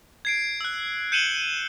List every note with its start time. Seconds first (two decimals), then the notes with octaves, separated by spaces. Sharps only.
0.25 G#6 C7 D7
0.61 E6 F#6
1.12 G6 C#7 D#7 E7 F#7 G7